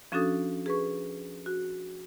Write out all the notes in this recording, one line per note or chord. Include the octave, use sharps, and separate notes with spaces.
F3 C#4 D4 F#4 A4 D#6
G#4 B4 C#6
F#4